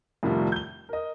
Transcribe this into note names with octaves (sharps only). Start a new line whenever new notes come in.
C2 F2 A2 D#3 F3 G3
G6 G7
A#4 D#5